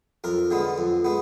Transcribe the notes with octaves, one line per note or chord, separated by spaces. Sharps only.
F2 A#4
D3 G#3 B3
F2
G#3 B3